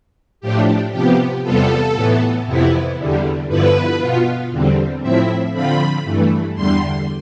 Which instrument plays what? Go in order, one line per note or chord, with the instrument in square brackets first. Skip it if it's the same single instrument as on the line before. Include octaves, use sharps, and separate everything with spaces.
[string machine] A2 F3 A3 D4 G4
C3 F3 B3 G4
E2 C3 G3 B3 F4 A4
A2 E3 B3
F2 C3 E3 B3 E4
E2 D3 G3
G2 D3 F3 B3 E4 B4
B2 B3 F4
E2 D3 G3 C4
A2 F3 C4 E4 E5
D3 F3 C4 F4 B5
G2 E3 A3
E2 D3 G3 C6